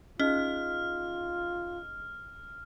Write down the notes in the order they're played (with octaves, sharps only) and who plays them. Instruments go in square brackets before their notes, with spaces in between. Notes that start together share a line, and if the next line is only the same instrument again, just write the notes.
[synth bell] C#4 [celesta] D#4 G#4 D#5 [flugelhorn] F4 [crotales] F6